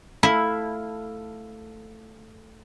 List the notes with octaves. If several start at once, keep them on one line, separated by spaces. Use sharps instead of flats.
A3 E4 A4 F5